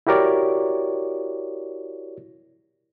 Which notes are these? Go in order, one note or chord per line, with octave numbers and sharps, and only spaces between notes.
E4 F#4 G4 A#4 C#5 D5